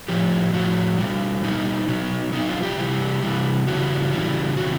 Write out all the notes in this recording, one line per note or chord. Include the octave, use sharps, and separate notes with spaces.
A2 F3 G4
A2 F3 F#4
B2 G3
B2 G3 D#4
B2 F#3
B2 F#3 D#4
F4
G4
C3 E3 G3
C3 E3 G3
C#3 E3 G3 F#4
C#3 E3 G3
C3 D#3 F#3 F#4